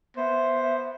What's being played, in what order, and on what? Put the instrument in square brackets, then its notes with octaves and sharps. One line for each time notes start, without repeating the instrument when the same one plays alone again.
[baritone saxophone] B3 [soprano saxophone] C5 [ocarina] E5